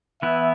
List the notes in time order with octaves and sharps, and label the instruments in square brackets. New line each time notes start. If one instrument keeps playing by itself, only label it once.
[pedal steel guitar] E3 B3 E4 [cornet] E5